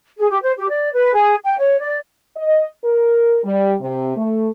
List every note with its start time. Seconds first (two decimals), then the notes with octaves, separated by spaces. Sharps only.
0.18 G#4
0.30 G4
0.42 C5
0.56 G4
0.69 D5
0.92 B4
1.14 G#4
1.43 G5
1.58 C#5
1.80 D5
2.36 D#5
2.84 A#4
3.44 G3
3.80 C3
4.16 A3